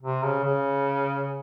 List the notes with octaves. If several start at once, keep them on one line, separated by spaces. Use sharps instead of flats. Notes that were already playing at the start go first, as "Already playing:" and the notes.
C3
C#3
C#3